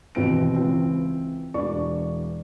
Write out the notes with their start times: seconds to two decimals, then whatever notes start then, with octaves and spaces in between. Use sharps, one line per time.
0.15 D#2 B2 E3 C4 B4 D7
0.56 C#2 E3 C4
1.54 E1 E3 D4 D5 C#6